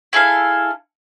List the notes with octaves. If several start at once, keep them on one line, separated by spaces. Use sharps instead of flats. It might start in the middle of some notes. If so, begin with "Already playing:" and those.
E4 G#4 A4 F5